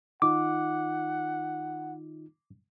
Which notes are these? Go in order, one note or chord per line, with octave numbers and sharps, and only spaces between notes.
D#3 D#4 F4 F#5 D6